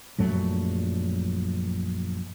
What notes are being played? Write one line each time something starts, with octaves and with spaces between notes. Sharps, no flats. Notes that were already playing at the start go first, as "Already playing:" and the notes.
A#1 F#2 F#3 A3